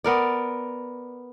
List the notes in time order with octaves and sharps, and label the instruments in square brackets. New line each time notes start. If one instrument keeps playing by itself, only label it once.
[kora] B3 A#4 D5